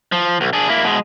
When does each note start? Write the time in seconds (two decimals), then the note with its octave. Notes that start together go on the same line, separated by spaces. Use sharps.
0.12 F3
0.41 B1
0.53 D4 G#4
0.69 A#3 E4
0.84 B2 G#3